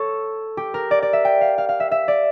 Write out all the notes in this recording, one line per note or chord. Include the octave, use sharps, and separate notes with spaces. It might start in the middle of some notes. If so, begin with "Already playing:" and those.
Already playing: A4 C#5
G4
A#4
D5
D5
E5
G5
F5
F5
F5
E5
E5
D5